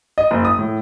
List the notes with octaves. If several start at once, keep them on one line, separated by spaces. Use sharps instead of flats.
D#5
F#1
D#6
A2